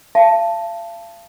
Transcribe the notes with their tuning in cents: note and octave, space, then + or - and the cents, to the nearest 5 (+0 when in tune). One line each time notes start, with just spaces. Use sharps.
F5 -40 A5 +0